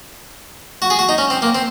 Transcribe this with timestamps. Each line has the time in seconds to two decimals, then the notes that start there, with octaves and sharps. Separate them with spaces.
0.82 F#4
0.90 G#4
0.99 F#4
1.09 D#4
1.18 C#4
1.30 C4
1.42 A#3
1.55 C4